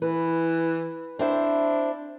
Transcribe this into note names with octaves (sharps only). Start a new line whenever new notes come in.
E3 B4
C4 D4 E4 C5